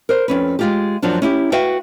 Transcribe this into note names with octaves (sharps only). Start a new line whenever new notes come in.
A#4 C5
F2 C#4 B4
G#3 F4 G4
F#2 F3 F#3 D4
C#4 E4 G4
F#4 B4 E5 F5 G5